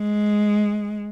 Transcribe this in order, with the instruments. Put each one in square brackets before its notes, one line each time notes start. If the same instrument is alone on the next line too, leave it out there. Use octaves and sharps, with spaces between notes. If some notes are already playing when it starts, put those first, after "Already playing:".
Already playing: [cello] G#3